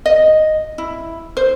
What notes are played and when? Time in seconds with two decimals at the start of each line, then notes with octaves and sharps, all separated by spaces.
0.06 D#5
0.78 E4
1.37 C5